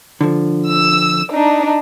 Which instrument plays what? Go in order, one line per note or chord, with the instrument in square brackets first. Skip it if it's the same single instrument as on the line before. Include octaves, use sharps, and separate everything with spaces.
[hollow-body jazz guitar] D3 F3
[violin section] E6
D4 D#4